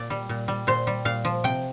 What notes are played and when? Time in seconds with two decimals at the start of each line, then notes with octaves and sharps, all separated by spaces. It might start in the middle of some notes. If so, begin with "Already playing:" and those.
Already playing: A#2 D5
0.10 G3
0.29 A#2
0.48 G3
0.67 A#2 C5
0.87 G3
1.05 A#2 F5
1.25 F3
1.44 C3 G5